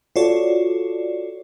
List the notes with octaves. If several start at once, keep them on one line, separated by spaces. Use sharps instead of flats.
F4 F#4 A4 C#5 D5